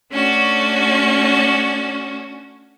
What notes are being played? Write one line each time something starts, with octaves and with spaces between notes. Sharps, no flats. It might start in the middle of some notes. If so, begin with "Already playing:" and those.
A3 C#4 D4 F#4